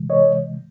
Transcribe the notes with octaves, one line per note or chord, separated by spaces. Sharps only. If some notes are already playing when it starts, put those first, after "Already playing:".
Already playing: C3 E3 G#3
C#5 D#5